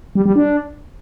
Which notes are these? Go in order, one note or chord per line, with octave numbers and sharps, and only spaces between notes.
G3
G3
D4